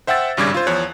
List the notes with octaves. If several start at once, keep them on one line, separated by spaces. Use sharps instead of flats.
C5 E5 F#5 G5 E6 A6
G#1 G2 C#3 G3 D6 G#6
F4 C5
E2 F3 C#5 F#6